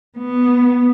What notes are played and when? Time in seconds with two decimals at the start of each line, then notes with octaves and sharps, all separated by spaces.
0.18 B3